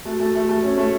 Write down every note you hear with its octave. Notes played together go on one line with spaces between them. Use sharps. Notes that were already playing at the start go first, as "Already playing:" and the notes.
A3 F#4
A3
A3
A3
C#4
A3